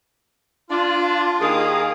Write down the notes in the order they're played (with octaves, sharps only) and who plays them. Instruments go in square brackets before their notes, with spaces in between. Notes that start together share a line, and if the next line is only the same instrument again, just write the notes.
[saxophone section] D4 [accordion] F4
[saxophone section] D#2 A#3 F5 [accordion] D#3 G#4 D#6